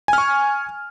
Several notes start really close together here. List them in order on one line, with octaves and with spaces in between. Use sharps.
G#5 F6 C#6